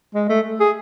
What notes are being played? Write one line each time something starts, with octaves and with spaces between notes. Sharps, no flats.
G#3
A3
G#4